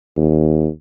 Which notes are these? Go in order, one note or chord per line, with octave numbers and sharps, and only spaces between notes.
D#2